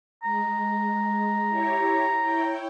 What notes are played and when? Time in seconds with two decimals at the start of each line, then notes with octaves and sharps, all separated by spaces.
0.23 G#3 A#5
1.49 E4 G4 C#5
2.20 E4 C#5 G5